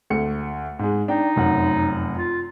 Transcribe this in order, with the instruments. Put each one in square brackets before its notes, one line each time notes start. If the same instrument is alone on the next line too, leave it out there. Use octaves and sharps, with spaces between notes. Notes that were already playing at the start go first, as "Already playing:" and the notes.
[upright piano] D2 A3 C#7
G#2 G#3
[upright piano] D4 G5 [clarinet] D#4
[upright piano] F1 F#2 F#5
[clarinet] F4